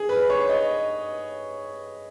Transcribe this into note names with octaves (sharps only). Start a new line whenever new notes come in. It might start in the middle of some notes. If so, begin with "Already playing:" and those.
Already playing: G#4
B4
C#5
D#5